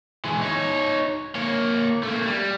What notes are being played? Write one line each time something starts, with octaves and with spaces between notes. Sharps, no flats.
E3 G#3
D#4 C#5
A#3 C#5
A3 A#3
G3